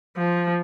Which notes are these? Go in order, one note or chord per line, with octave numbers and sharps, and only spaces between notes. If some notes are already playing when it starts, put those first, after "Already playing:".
F3